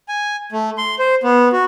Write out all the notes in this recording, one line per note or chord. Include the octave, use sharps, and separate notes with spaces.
G#5
A3
C6
C5
B3
F#4